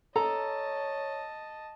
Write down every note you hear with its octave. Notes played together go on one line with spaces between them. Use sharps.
A4 C#5 D#5 A5 A#5